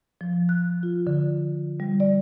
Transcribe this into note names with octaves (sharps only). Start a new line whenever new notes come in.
F3
F#6
F4
D3
G3
D5